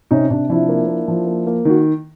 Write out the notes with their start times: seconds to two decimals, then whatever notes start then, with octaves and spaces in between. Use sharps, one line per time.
0.11 C3 C#4 D#4
0.30 C3 D4
0.49 F3 D4 E4
0.69 A#3
0.88 A#3
1.08 F3
1.27 A#3
1.47 A#3
1.65 D#3 F#4